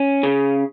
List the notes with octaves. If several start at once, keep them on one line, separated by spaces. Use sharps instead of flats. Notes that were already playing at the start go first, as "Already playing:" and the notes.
Already playing: C#4
C#3